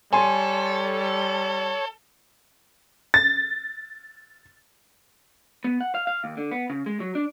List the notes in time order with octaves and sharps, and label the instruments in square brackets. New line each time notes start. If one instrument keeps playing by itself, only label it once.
[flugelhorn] G3 [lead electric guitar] A4 [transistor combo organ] C#5 [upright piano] G#5 C6
[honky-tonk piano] A6
[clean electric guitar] B3
F#5
F5
F5
D#2
D3
B3
C#3
G#3
F#3
D4